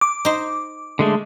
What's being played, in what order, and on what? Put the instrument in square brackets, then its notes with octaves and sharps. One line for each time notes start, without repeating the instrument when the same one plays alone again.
[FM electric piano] D6
[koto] D#4 C5
[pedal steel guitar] D3 G#3 A3